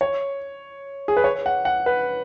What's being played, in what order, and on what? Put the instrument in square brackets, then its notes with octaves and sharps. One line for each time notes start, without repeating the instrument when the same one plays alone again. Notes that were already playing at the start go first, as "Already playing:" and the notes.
[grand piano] C#5
G#4
B4
C#5
F#5
F#5
B4